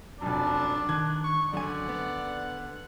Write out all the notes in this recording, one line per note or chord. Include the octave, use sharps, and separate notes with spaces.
F1 F#2 D4 A5
D#3 F#6 G#6
C#6
F#2 D3 D5 F#5 G#5
B3